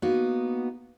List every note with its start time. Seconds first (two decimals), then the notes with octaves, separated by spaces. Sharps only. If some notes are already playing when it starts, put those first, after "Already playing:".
0.02 A#3 B3 D#4 F#4